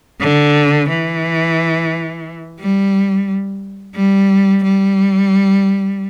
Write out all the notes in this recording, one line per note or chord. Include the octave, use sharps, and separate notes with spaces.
D3
E3
G3
G3
G3